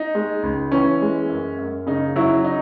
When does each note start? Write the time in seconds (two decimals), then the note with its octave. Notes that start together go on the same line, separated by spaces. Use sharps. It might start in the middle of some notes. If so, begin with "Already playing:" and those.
Already playing: D#4
0.15 G#3
0.43 C#2
0.72 E3 C#4
1.01 G#3
1.29 F#2
1.59 F#2
1.87 C#3 D#4
2.16 F#3 E4
2.44 D#4